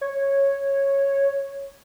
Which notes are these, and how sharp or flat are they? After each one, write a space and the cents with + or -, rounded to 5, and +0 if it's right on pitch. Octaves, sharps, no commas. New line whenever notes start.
C#5 -5